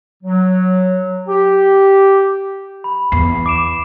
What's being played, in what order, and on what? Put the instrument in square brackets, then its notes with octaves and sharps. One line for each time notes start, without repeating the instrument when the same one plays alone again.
[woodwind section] F#3
G4
[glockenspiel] B5
[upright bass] E2 [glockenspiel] C7
[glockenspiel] D6 D7 E7